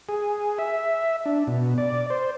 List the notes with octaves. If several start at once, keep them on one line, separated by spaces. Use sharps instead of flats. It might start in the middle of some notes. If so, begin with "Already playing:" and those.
G#4
E5
D4
B2
D5
C5